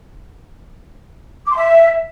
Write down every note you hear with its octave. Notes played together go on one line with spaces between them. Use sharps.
D6
C6
E5